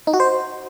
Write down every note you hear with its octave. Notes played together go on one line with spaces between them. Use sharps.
D#4
F#4
C5